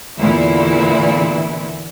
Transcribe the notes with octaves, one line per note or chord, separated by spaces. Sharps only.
E2 A#2 D3 E3 E4